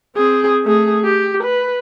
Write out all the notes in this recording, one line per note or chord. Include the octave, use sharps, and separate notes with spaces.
C4 G#4
A3 G#4
G4
B4